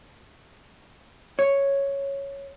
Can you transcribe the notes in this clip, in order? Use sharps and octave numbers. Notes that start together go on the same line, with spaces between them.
C#5